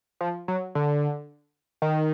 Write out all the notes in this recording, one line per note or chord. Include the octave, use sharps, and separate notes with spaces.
F3
F#3
D3
D#3